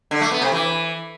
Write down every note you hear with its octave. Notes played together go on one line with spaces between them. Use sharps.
D3
A3
B3
C3
E3